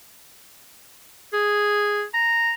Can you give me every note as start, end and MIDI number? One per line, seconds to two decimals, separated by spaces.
1.33 2.03 68
2.14 2.53 82